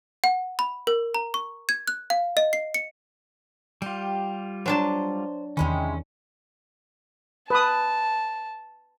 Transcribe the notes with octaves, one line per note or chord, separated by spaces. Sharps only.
F#5
B5
A#4
A#5
C#6
G#6
F#6
F5
D#5
C7
C#7
G3 F4 G4
F#3 D4 C5 A5
E2 C3 D#3 G#3 C#4 E4
B4 A5 D#6